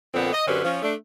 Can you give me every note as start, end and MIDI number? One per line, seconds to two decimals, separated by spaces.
0.14 0.31 41
0.14 0.31 46
0.14 0.31 50
0.14 0.31 59
0.14 0.31 60
0.33 0.44 75
0.47 0.63 42
0.47 0.63 50
0.47 0.63 60
0.47 0.63 61
0.47 0.63 67
0.47 0.63 71
0.64 0.81 53
0.64 0.81 61
0.83 0.95 57
0.83 0.95 62